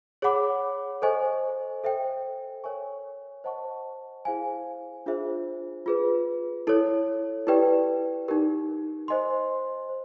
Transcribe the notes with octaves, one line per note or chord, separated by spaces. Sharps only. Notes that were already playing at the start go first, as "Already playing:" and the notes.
G#4 C#5 F#5 B5 D6
A4 C5 D#5 G#5 C#6
A4 C5 E5 G5
A#4 C#5 E5 G#5 C#6
C5 D#5 F#5 A5 C#6
E4 G#4 C5 F5 G#5
D4 F4 G#4 C5 E5
F4 G#4 B4
E4 A4 C#5
E4 G4 B4 D5 G5
D#4 G4 A#4
C5 D#5 G#5 C6
C5